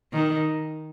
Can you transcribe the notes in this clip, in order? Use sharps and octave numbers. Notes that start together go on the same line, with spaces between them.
D#3